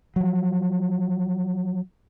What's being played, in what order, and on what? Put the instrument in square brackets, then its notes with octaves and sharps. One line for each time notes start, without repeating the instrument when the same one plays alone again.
[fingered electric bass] F3 F#3